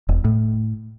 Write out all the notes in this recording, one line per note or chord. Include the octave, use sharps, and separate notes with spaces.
E1
A2